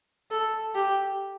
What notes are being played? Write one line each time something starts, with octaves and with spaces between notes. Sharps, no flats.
A4
G4